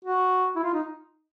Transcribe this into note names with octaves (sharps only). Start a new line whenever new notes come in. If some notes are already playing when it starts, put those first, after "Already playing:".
F#4
E4
F4
D#4